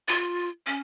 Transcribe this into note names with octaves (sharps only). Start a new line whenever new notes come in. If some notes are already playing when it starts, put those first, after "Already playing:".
F4
C#4